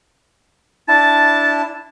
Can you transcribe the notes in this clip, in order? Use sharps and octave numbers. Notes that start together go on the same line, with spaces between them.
D4 E4 A5 A6